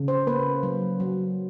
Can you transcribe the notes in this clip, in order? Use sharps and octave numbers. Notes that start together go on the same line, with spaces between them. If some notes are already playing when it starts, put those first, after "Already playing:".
Already playing: C#3
C5
A#3 B4
F#3
F#3